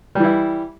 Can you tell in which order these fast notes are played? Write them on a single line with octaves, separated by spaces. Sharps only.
G3 E3 E4